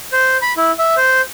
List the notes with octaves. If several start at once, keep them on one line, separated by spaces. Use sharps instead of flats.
C5
B5
E4
E5
C5